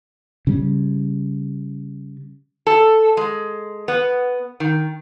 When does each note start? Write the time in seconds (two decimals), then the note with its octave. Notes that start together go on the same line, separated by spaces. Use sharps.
0.47 C#3 G3
2.67 A4
3.17 G#3
3.88 B3
4.60 D#3